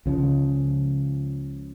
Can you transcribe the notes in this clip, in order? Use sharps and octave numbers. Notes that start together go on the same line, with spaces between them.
C#2 C#3 F3